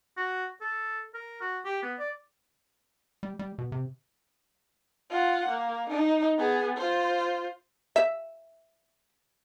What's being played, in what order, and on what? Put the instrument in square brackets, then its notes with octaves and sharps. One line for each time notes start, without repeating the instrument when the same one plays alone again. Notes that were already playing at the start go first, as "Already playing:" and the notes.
[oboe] F#4
A4
A#4
F#4
G4
B3
D5
[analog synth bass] G3
G3
B2
C3
[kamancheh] F4 F#5
A#3
D#4
B3 G#4
F4 C5
[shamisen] E5